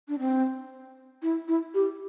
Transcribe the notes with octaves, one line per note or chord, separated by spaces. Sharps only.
D4
C4
E4
E4
G4